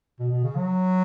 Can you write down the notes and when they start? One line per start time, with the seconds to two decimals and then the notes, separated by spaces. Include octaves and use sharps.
0.20 B2
0.32 B2
0.44 C#3
0.57 F#3